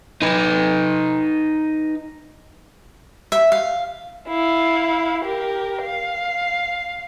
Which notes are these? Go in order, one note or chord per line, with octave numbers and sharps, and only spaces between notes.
D#4 B4
E5
F5
E4 F5
G4 A#4
F5